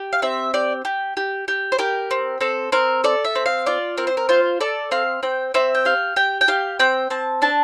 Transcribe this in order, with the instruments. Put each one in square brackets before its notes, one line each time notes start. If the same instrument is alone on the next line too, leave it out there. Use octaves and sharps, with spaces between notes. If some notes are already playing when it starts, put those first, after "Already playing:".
Already playing: [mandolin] G4
F5
C4 E5
G4 D5
G4
G4
G4
C5
G4 A#4
C4
C4 A4
C4 A#4
A4 D5
E5
C4
F5
F4 D5
C4 A#4
C5
A#4
F4 C5
A4 D5
C4 F5
C4 G5
C4 E5
G5
G4 F5
G4 G5
G5
G4 F5
C4 G5
C4 A5
D4 A5